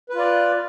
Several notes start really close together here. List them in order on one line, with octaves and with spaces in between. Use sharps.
B4 F4 D5